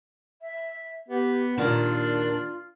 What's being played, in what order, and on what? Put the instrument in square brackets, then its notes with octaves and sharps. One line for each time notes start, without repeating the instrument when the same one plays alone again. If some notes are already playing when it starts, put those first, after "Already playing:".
[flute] E5
[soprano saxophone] B3 [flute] G4
[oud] D#2 A#2 D#3 [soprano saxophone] D4 [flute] F4